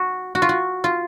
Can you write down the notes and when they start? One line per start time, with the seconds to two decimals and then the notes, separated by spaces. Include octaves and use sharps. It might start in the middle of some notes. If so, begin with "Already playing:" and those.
Already playing: F#4
0.35 F#4
0.42 F4
0.49 F#4
0.84 F4